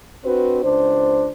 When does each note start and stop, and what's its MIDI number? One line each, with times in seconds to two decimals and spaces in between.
0.24 0.60 60
0.24 0.60 62
0.24 0.60 66
0.24 0.60 71
0.24 0.60 72
0.62 1.30 37
0.62 1.30 62
0.62 1.30 72